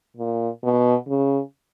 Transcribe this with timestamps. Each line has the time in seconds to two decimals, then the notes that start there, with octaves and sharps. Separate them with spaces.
0.17 A#2
0.63 B2
1.08 C#3